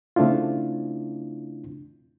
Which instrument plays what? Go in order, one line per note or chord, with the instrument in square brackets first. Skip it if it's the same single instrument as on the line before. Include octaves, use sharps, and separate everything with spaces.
[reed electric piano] C#3 A3 C4 D4 E4 F4